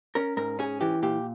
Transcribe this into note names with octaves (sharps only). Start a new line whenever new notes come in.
C#4 A#4
G#2 A#4
C#4 G#4
E3 G4
A#2 G4